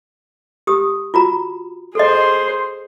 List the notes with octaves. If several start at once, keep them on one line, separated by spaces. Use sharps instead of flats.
G4 D#6
F4 F#4 A#5
G#4 A4 C5 D#5